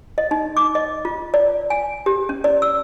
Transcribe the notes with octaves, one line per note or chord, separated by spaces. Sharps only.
D#5
D#4
D6
D#5
F4
D5
G#5
G4
C#4
D5
E6